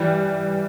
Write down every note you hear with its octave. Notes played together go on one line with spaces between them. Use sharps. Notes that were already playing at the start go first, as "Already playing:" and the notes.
Already playing: E3 G3